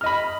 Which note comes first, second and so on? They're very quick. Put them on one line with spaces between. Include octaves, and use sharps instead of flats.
F6 D#5 B5